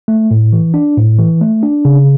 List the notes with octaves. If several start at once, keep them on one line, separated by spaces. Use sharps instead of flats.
A3
A2
E3
D4
A2
E3
A3
D4
C#3